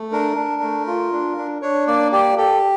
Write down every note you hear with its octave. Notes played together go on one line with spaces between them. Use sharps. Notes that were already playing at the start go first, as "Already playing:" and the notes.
Already playing: A3
D4 A#4
D4
A3
F4
D4
D4
D4 C#5
A#3 D5
G4 D5
G4 A4